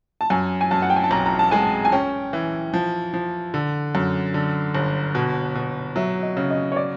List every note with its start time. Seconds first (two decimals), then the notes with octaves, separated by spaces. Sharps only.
0.21 A5
0.30 F#2 G#5
0.61 G#5
0.71 F#2 A5
0.82 F#5
0.90 G5
0.96 G#5
1.04 A5
1.11 B1 A#5
1.26 A#5
1.39 A5
1.51 G#3 G#5
1.85 G#5
1.92 C#4 G5
2.33 E3
2.74 F3
3.14 F3
3.54 D3
3.95 F#2
4.34 D3
4.75 G1
5.15 B2
5.55 B2
5.96 F#3 E5
6.22 D#5
6.37 C#3
6.51 D#5
6.72 C#5
6.76 D5